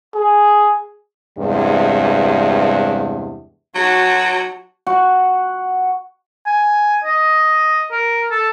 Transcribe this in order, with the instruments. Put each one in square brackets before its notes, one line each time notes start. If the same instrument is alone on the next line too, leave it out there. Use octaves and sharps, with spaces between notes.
[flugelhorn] G#4
[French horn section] E2 G2 C3 G#3
[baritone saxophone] F#3 [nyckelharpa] F#4 A5
[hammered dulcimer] F#4
[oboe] G#5
D#5
A#4
A4